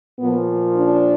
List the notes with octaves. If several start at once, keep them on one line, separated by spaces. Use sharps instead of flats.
A#2 F3 B3
D4